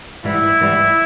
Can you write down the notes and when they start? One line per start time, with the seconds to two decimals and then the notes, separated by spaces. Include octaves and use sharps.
0.24 G#2 E3 G3 E4
0.60 G#2 E3 G3